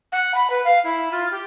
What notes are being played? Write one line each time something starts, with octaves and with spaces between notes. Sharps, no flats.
F#5
B5
B4
F5
E4
F4
G4